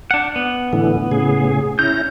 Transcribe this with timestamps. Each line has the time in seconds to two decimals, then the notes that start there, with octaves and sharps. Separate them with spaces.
0.11 D4 F#5
0.36 B3
0.73 A2 D3 E3
1.11 A2 C#3 G#4
1.79 C#4 E4 A#5 G6